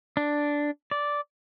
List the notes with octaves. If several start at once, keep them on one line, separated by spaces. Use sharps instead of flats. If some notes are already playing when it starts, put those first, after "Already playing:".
D4
D5